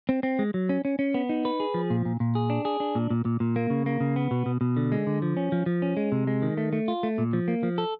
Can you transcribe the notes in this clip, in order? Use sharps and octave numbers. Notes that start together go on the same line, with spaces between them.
C4
C4
G#3
F#3
C#4
C#4
C#4
B3
D#4
B4
G#4
F3
A#2
A#2
A#2
G#4
D4
G#4
D4
A#2
A#2
A#2
A#2
A#3
C#3
A#3
C#3
B3
B2
B2
B2
D3
G#3
D3
F3
C#4
F3
F3
C#4
G#3
C3
G#3
D#3
A3
A3
F4
A3
A#2
F3
A#3
F3
A4